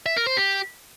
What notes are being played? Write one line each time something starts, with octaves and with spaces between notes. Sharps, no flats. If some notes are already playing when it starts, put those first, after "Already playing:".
E5
A#4
C5
G4